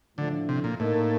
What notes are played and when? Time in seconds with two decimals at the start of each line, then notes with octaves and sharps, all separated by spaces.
0.18 A2 D3 F3 A3 D4
0.49 C3
0.64 A#2
0.80 A2 A#3 D#4 A#4